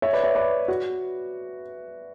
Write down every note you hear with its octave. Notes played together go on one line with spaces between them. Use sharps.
C#5 E5
B4 D5
C#5 E5
B4 D5
F#4